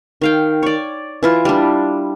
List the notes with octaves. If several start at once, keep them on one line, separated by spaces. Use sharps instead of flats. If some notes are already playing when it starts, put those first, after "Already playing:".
D#3 F5 G5
C#5 D5
E3 E4 F4
G3 D4